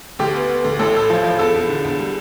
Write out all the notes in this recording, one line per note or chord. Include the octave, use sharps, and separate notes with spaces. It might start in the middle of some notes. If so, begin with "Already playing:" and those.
D2 G4
B3
B3
D2
A1 A4
A2 A4
F3
F3
E2 A4
E2
D3
E2
G3